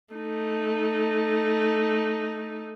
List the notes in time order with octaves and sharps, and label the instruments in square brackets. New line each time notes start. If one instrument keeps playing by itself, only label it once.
[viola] A3 D#4